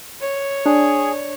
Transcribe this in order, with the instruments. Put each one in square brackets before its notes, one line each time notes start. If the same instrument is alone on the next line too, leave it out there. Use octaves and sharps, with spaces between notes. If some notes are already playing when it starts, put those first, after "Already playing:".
[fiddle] C#5
[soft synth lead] D4 [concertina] G#4